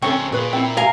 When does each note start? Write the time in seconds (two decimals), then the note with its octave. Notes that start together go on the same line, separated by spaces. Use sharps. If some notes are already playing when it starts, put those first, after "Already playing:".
0.02 C#3 C4 C#4 A4 C5 C#6
0.32 A#2 G#4 B4
0.53 C4 E4
0.77 A#4 F5 G#5 A#5